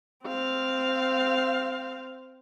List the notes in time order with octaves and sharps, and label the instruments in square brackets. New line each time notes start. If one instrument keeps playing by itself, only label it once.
[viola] C4 F5